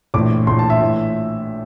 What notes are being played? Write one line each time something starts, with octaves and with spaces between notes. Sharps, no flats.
A#1 A2 E3 D6
A#1 A2 E3 C6
A5
E5
A2 E3